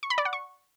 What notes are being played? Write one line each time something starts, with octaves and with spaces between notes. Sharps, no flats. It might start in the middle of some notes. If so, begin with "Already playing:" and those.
C#6
B5
D5
F#5
C#6